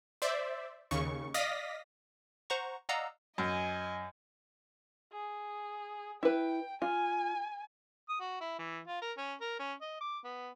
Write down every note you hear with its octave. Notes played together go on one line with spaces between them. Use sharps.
C5 D5 E5
D#2 C#3 C#6
D5 D#5 F5 D#6 A#6 B6
C5 F#5 A#5 C#6
D5 D#5 F5 F#5 A#5 E6
F#2 D#5 G#5
G#4
E4 B4 G5
F4 G#5
D#6
F#4
E4
E3
F4
A#4
C#4
A#4
C#4
D#5
D6
B3